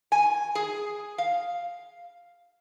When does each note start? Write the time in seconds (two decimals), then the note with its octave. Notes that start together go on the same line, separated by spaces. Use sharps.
0.12 G#5
0.55 G#4
1.18 F5